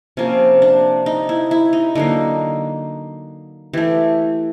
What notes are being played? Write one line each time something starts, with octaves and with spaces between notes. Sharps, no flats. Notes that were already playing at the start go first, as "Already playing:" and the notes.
C3 F3 A#3 C#4
D4
D#4
E4
E4
D#4
D3 F#3 A#3 D#4
E3 A3 G4